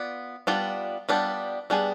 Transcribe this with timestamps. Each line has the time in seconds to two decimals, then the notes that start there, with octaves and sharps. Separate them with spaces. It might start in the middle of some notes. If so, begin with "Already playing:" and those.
Already playing: B3 F4 D5
0.47 G3 B3 D4 F4
1.09 G3 B3 D4 F4
1.70 G3 B3 D4 G#4